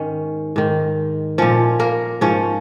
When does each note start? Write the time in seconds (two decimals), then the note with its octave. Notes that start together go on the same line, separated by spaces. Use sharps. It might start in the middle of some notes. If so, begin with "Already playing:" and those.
Already playing: G#2 D#3 C#4
0.56 G#2 D#3
1.38 A#2 F3 C#4 C#5
1.80 A#3 A#4
2.21 G#2 F3 C#4 C#5